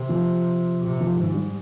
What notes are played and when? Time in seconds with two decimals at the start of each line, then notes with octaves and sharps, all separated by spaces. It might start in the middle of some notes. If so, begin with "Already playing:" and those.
Already playing: C3
0.09 F3
0.84 C3
1.00 F3
1.17 G#2 D#3
1.34 G3